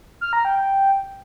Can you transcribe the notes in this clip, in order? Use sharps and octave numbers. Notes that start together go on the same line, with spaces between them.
F6
A#5
G5
G5